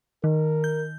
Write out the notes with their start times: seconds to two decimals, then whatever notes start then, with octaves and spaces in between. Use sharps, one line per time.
0.24 D#3 A#4
0.64 G6